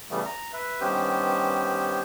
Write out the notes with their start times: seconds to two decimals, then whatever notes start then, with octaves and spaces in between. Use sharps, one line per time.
0.10 C#3 E3 G3 A3 B3
0.26 A#5
0.53 B4 E5
0.81 G2 D#3 B3 C#4 G4 C5